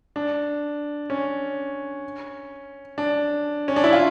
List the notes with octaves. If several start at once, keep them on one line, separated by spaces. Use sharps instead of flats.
D4
C#4
D4
C#4
D4
E4
F4